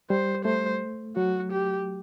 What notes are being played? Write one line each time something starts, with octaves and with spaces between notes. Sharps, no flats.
G3 C5
A3 C5
F#3 F#4
G4